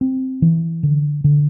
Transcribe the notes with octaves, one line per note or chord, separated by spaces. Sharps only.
C4
E3
D3
D3